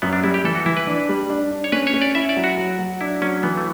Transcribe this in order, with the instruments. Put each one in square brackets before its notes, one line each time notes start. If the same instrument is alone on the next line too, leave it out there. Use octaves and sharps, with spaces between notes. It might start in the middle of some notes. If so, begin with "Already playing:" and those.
[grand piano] F#2 [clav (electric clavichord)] B3
[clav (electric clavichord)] D4
[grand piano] G3 [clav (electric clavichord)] E4
[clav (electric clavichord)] G4
[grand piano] E3 [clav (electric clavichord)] A4
[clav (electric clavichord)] F#4
[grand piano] E3 [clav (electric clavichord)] E4
[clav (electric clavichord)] B4
[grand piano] D4
G3
D4
D4
[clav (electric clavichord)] C#5
[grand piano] C#4 [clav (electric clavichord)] B4
[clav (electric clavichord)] C#5
[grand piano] C#4
[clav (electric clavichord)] D5
[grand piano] E4 [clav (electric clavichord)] E5
[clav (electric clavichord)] D5
[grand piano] F#3
[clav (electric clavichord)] F#4
[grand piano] F#3
F#3
[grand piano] D4 [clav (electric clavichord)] E4
[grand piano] F#3 [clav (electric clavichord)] C#4
[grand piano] E3 [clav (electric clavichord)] B3
[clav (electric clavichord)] A3